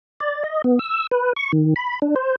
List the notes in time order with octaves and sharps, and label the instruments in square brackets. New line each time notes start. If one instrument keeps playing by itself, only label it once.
[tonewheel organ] D5
D#5
B3
E6
B4
C#6
D#3
B5
D4
C5